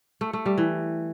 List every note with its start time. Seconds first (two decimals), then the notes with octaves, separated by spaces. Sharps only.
0.21 A3
0.33 A3
0.46 G3
0.58 E3